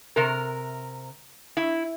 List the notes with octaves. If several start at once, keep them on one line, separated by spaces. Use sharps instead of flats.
C3 A#4
E4